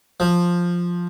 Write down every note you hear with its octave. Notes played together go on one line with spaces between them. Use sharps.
F3